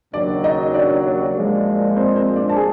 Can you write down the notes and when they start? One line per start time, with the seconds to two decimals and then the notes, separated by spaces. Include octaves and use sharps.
0.13 D#2 C#3 F#3 D4 D5
0.44 D#4 D#5
0.74 D4 D5
1.34 A#2 F3 G#3
1.96 C4 C5
2.16 C4 C5
2.36 D4 D5
2.49 A5
2.56 G#4 G#5